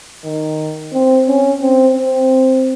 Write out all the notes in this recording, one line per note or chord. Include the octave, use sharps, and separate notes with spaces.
D#3
C4
C#4
C4
C4